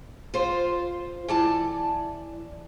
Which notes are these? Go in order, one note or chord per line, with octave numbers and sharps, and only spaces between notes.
F4 C5
E3 D5 A5